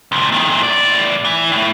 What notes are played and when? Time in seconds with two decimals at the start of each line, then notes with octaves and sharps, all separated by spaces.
0.12 C#2 A#2
0.32 F2 D#3
0.50 A#2 E3
0.63 A2 D5
1.25 E3
1.52 A2